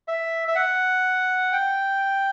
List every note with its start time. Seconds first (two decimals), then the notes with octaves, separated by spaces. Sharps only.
0.08 E5
0.48 E5
0.56 F#5
1.52 G5